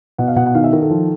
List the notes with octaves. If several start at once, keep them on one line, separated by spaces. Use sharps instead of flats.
B2 F#5
F5
B2 F#5
F#5
D#3 F5
E5
D#3 A#4
A4
F3